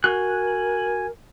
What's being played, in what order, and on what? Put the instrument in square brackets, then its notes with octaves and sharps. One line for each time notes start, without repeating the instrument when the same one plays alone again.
[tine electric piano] F#4 [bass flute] A#4 [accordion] G#5 [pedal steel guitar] F#6